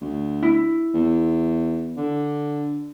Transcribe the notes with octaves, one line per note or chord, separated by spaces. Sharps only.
D2
E4
E2
D3